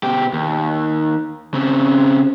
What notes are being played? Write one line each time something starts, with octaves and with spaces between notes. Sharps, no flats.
B2 G4
D#2
C#3 C4